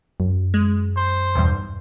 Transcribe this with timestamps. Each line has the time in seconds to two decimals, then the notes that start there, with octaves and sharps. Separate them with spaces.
0.20 F#2
0.54 G#3
0.97 C5
1.35 B1 E2 G2